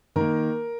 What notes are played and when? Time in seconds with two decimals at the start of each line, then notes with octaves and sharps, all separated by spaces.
0.16 D#3 A#3 A#4